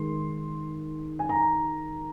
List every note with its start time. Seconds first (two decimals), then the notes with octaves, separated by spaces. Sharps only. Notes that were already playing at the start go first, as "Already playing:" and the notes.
Already playing: D#3 G#3 C6
1.19 G#5
1.29 A#5